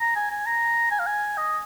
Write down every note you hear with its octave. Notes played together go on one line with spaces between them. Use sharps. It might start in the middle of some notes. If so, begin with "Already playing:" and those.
A#5
G#5
G#5
A#5
G#5
F5
G#5
D#5